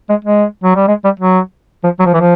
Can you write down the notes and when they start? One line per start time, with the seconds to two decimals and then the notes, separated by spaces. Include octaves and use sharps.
0.09 G#3
0.25 G#3
0.64 F#3
0.76 G3
0.88 G#3
1.04 G3
1.20 F#3
1.83 F3
1.99 F#3
2.06 F3
2.14 E3
2.20 F3